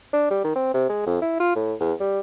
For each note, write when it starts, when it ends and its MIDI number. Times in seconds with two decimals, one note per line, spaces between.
0.13 0.28 62
0.31 0.39 55
0.44 0.51 51
0.56 0.70 60
0.74 0.84 48
0.89 1.06 56
1.07 1.17 41
1.22 1.35 64
1.40 1.55 65
1.56 1.74 45
1.80 1.93 40
2.00 2.20 55